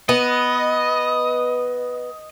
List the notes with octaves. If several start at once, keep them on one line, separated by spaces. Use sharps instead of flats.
B3 D#5